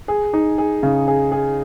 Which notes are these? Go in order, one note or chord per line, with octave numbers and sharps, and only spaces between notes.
G#4
D#4
G#4
C#3
G#4
G#4